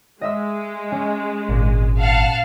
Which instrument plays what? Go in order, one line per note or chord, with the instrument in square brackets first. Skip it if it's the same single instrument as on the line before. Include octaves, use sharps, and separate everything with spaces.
[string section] G#3 [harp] D#5 E5 E6
[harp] C#4
[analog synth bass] G#1 [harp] A#2
[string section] F5 F#5 A5